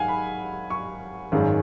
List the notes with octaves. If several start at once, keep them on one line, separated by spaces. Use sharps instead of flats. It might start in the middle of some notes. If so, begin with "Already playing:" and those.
Already playing: G#2 D#3 F#3 F5 F#5 G#5
B5
C#6
G#1 F#2 D#3 G#3